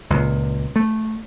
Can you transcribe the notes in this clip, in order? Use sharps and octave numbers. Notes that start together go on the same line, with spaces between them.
C#2 A#2
A3